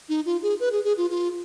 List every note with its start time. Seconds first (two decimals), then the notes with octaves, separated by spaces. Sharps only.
0.09 D#4
0.26 F4
0.43 G#4
0.60 B4
0.72 G#4
0.84 G#4
0.98 F4
1.10 F4